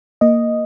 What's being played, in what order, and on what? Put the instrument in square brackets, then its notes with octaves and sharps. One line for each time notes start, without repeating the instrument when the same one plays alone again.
[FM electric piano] A#3 D#5